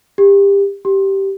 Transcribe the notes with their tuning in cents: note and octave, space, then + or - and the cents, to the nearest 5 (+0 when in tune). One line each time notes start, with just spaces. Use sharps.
G4 +25
G4 -10